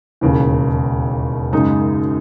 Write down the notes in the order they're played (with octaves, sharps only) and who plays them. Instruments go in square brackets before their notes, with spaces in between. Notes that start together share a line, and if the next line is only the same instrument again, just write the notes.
[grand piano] E1 D#2 C#3 E3
F#2 C#3 G#3 D#4